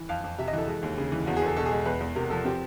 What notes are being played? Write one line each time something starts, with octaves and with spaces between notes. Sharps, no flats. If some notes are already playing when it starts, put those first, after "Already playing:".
Already playing: E3
F2 F5
F2
C3 E5
D#5
E3 A4
G#3
D#2
C#3
E3
E2 F#4
G#4
E2 A4
B2 A4
G#4
G#3
E2 B4
E2
C3 A#4
F3 A4
C4 G4